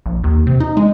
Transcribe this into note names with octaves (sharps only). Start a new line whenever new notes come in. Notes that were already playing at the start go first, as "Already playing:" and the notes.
A#1
D#2
C3
D#4
G#3